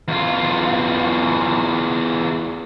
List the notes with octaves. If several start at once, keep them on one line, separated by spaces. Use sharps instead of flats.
E2 F4